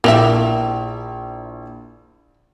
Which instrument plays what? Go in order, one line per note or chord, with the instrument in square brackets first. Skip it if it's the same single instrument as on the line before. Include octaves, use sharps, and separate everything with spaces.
[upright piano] A#1 E4 F7 [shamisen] A#3 G4 E5